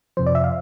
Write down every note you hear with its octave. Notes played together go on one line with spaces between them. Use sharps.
F2 C3 F3 C5
D5
E5
F5